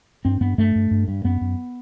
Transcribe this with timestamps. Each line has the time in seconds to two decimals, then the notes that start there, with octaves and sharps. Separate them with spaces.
0.25 G2 C4
0.41 G2 B3
0.58 G2 A3
0.75 G2
0.91 G2
1.08 G2
1.24 F#2 B3
1.41 F#2